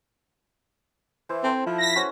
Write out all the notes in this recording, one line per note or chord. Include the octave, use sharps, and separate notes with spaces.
E3 E4 C5
C4 A4
F3 E4
B5 A#6 B6
C#4 F#4 B4 C5